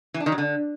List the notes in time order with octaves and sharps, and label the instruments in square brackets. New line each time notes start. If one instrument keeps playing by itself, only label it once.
[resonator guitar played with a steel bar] E3
D4
D#3
F#3
D3